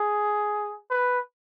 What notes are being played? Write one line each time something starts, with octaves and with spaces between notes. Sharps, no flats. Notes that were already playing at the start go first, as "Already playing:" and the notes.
Already playing: G#4
B4